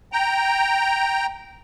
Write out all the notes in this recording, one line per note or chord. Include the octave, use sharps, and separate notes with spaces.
G5 A#5